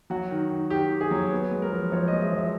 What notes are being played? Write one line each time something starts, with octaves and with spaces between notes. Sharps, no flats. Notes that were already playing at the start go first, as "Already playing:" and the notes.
F#3 F#4
D#3
D#3
D#3 G4
D#3
G#4
F#3
B3
G#3
A#4
F3
F3 C#5
G#3 D#5
E5
F3 E5